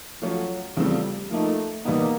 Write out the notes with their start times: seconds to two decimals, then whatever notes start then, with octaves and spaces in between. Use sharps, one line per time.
0.22 F3 F#3 A3 C#4 F4
0.76 E2 C#3 F3 G3 A3 C4
1.31 F3 A3 A#3 D#4
1.85 E2 B2 G3 A#3 B3 D#4